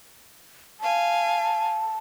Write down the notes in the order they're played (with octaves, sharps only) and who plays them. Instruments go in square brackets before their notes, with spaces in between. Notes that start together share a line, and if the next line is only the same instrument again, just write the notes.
[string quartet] F5 G#5 [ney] A5